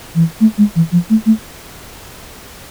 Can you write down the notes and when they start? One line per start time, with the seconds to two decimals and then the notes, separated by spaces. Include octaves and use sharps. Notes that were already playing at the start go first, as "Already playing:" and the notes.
0.15 E3
0.40 A3
0.58 G#3
0.76 E3
0.92 F3
1.10 A3
1.26 A3